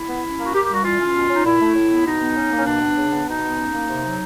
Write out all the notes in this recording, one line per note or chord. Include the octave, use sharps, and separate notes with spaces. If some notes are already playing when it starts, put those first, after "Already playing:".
Already playing: E4
B3
C#4
A#3
F#4
A#3 G4
G3 G4
F#4
E3 F4
C#4
B2
C#4 D#4
A#2 E4
A3
A2
B3
B2 D#4
B3
C#4
A#3
C#4
B2 D4
B3
C#3
B3
B2 D#4
B3
C#4
A#3
C3
F#3